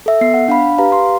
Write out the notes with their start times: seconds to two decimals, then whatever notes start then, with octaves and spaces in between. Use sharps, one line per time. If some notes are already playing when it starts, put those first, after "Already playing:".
0.06 A4 E5
0.21 B3 C7
0.34 F#5
0.48 D4 F5 B5
0.78 G4 B4 F5 A#5
0.92 C6